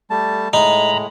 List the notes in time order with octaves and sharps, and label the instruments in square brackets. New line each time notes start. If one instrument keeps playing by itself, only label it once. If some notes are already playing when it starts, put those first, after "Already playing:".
[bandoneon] G3 A3 A5
[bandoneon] A2 G#3 [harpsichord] D#4 [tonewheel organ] A#5 B5